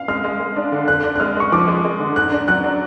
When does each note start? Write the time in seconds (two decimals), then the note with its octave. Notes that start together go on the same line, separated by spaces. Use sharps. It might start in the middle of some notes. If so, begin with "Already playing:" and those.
Already playing: F5
0.08 G#3 F6
0.24 G#3
0.40 G#3
0.56 D4
0.72 D3
0.88 D3 F#6
1.04 D4
1.16 F#6
1.20 G#3 F6
1.37 G#3 C#6
1.52 F3 D6
1.68 G#3
1.85 G#3
2.00 D3
2.16 G#2 F#6
2.32 D4
2.48 F#3 F#6
2.64 D4